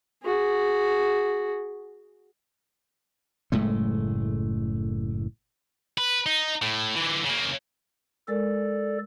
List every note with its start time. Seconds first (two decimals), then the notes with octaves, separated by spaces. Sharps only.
0.23 F#4 G#4
3.52 F#1 A2 G#3 A3
5.98 B4
6.26 D#4
6.62 A2
6.96 D3 E3
7.25 C#3 A#3
8.28 G#3 A4 A#4 D5